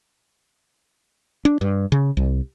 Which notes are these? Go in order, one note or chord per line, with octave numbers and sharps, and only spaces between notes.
D4
G2
C#3
C2